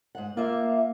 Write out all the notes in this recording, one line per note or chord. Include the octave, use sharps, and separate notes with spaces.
G#2 F#5
A#3 F4 E5